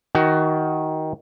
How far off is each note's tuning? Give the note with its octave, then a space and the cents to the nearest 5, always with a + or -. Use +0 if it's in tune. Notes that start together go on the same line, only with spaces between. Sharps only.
D#3 +15 F#4 +20